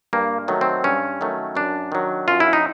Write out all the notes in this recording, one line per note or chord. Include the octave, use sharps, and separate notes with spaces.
G2 A#3
D#3 F#3 A3
C4
G2 C#4
D#3 F#3 A3
F#2 D4
D#3 F#3
F#2 F4
E4
D#4